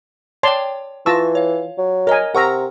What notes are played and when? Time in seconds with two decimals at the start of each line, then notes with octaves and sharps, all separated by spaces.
0.43 C#5 D5 G5 A5 C6
1.06 E3 F4 A5 C#6 E6 A#6
1.35 C#5 F5
1.78 F#3
2.07 A#4 C#5 D#5 G#5
2.35 C3 A#4 F#5 A#5 C#6 E6